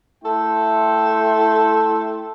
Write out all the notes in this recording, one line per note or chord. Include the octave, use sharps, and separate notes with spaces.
A3 E4 A4 G5 C6